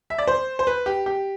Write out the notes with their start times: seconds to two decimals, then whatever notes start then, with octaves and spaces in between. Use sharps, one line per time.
0.10 E5
0.18 D5
0.27 C5
0.59 C5
0.67 B4
0.86 G4
1.06 G4